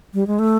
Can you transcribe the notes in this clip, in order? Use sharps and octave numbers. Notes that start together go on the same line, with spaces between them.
G3
G#3
A3